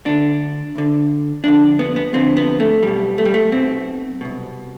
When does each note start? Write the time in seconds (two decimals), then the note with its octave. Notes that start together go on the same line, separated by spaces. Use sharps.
0.05 D2 D3 D4
0.76 D2 D3
1.44 F2 D3 D4
1.79 B3
1.96 B3
2.13 F2 D3 C4
2.37 B3
2.60 A3
2.82 B1 B2 G3
3.18 A3
3.25 G3
3.34 A3
3.52 B1 B2 C4
4.21 C2 B2